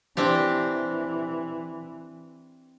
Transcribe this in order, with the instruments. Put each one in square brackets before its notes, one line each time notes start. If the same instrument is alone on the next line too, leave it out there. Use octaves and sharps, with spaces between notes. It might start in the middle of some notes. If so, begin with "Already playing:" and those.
[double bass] E3 [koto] C4 D4 G4